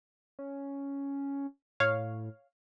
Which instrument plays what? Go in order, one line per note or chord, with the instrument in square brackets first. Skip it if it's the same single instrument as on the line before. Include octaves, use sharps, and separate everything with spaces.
[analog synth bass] C#4
[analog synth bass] A2 [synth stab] C#5 F5